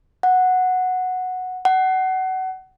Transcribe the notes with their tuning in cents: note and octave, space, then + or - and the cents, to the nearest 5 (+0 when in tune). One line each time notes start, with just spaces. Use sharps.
F#5 -5
F#5 +25